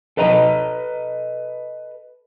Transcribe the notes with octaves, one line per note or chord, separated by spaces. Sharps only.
A4 B4 D#5 A#5